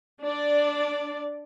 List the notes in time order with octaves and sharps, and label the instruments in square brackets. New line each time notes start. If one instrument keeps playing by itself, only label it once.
[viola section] D4 D5